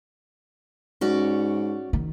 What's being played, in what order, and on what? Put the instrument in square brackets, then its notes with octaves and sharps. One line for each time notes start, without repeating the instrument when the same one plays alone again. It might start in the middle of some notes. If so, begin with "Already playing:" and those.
[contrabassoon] G#2 [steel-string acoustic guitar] C#4 F#4 D5
[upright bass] D#3